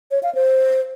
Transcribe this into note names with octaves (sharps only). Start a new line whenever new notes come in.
C#5
F5
C5